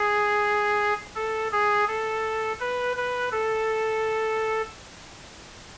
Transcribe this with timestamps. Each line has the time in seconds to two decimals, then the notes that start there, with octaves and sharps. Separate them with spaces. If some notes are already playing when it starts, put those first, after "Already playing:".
Already playing: G#4
1.15 A4
1.52 G#4
1.88 A4
2.60 B4
2.96 B4
3.32 A4